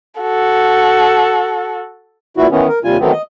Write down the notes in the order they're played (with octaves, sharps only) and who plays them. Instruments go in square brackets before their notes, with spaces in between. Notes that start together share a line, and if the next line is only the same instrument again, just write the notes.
[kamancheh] F#4 A4
[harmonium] A#2 E3 E4 F#4
D#3 E3 B3 C#4
A#4
D#2 C3 G3 F4 G#5
D#3 E3 F#3 A3 B3 C4
D#5